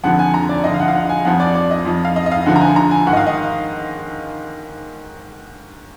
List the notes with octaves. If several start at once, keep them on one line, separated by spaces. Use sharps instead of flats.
F2 D3 F3 F#5
G#5
A#5
D5
D2 D3 F3 D#5
F5
F#5
F5
F#5
G#5
F2 F3 F#5
D5
D5
D#5
F2 F3
F5
D#5
D#5
F5
D2 D3 F3 F#5
A#5
G#5
A#5
G#5
G#2 D#3 F#5
D#5
F5
D#5